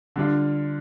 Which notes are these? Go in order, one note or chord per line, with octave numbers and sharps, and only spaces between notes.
D3 G3 D4 F4